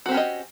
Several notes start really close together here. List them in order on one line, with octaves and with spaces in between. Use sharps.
F#4 C4 G4 C#4 D#5